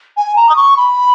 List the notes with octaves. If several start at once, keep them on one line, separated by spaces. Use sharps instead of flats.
G#5
A#5
D#6
C#6
B5